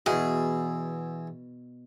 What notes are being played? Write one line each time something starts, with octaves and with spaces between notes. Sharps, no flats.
E2 B2 E4 G#4